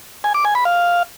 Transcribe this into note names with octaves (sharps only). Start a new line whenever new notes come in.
G#5
D6
G#5
B5
F5